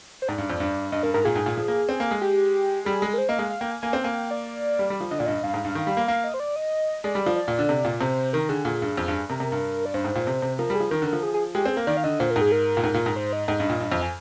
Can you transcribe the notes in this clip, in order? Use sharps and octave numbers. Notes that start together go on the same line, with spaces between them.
C5
G#2 D5
G2
F2
G2
G2 D#5
G2 A#4
G#2 A#4
A#2 G#4
G#2
A#2
F3
A#3
C4
A#3
G#3
G4
G3 G#4
G#3
A#4
C5
A#3 D#5
G#3 F5
F5
A#3 G5
G#5
A#3 G#5
C4
A#3 G#5
G5
D5
G3
G3
F3
D3 D#5
A#2 D5
G2 D#5
G2 F5
G#2
G2
D#3
G3
A#3
A#3 F5
D#5
C5
D5
D#5
G#3 D5
G3
F3
D5
A#2
D3
C3
A#2
C3 C5
D#3 A#4
D3 G#4
A#2 G#4
G2
F2
G2
C3 A#4
C3
G2
D5
G2 C5
G#2
A#2
C3
C3
F3 A#4
G3
G#4
F3
D#3 A#4
D3
A#4
F3
G#4
G#4
G#3 G4
C4 G#4
A#3 A#4
D#3 D5
F5
D3 D#5
A#2 C5
A#4
G#2
G#4
A#4
A#2
G#2 A#4
A#2
G#2
C5
D#5
G#2 D#5
G2
A#2
G2
F2
G#5